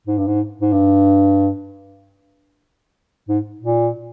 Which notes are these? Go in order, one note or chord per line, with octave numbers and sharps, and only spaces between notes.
G#2
G2
G#2
G#2
G2
G#2
A#2